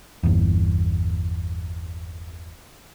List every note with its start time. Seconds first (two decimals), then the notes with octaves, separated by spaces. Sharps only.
0.23 G1 E2